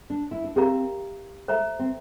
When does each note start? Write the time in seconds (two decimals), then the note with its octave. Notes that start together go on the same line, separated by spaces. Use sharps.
0.10 D4
0.31 E4
0.44 D4
0.56 C4 G4 A#4 F5 A#5
1.48 A3 C5 E5 A#5
1.79 C4